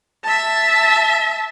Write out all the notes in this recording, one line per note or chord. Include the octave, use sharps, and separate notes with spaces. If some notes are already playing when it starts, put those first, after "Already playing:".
E5 A5